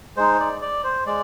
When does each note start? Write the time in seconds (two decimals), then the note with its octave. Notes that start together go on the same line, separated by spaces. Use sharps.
0.17 G#3 D#4 C5
0.40 D5
0.61 D5
0.84 C5
1.06 G#3 D5